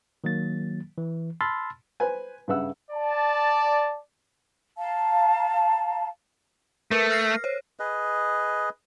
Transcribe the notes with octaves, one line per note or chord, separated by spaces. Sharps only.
D#3 F#3 A#3 A6
E3
A5 B5 C6 E6 F6 A6
B4 C5 G#5
G2 C#3 B4 E5 F#5 E6
D5 A5
F5 A5 A#5
A3 A#4 B4
F6 A#6 C7
C5 C#5
G#4 B4 D#5